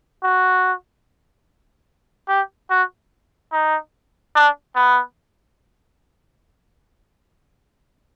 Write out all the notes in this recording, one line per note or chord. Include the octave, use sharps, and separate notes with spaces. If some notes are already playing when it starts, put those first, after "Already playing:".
F#4
G4
F#4
D#4
D4
B3